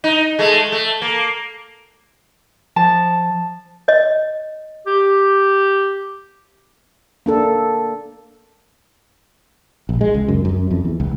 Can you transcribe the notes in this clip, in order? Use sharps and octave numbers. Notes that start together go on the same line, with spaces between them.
D#4
G#3 A3
A3
A#3
F3 A5
C#5 D#5
G4
A#3 D4 A4
A#1
G#3
C#2
F#2
F#2
F2
E2
C#2